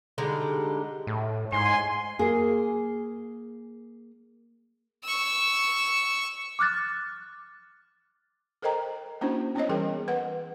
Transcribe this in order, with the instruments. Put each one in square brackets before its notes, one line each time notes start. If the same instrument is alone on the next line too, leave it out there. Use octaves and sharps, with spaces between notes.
[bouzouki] D3 G3 G#3 D#4
[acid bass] A2
[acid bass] G#2 [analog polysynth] G#5 [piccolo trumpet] C6
[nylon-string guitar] A#3 G#4
[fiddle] C#6 E6
[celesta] D6 F6 F#6 A6
[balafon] A4 A#4 C5 D#5 G5 A#5
A#3 C#4 D4 E4 F#4 C5
B3 C#4 C5 C#5 D#5
E3 G3 G#4 A#4 G5
B4 F#5